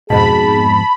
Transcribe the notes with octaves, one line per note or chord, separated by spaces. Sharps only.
F2 G#2 B2 G#4 A5 B5